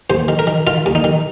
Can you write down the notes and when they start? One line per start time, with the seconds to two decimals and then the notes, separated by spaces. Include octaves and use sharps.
0.10 D#2 C5
0.28 D#3
0.39 A#4
0.47 D#3
0.67 D#3 F4
0.86 D#2
0.95 D#4
1.04 D#3